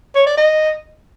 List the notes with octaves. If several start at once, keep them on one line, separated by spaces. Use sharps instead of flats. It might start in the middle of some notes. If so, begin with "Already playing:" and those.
C#5
D5
D#5